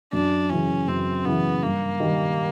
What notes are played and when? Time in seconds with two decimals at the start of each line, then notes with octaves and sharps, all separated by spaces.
0.13 F#2 D4
0.50 C#3 E3 C#4
0.88 F#2 C4
1.25 C#3 E3 B3
1.62 G2 A#3
2.00 D#3 G3